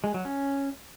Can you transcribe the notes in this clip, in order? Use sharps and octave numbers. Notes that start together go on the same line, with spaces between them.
G#3
F#3
C#4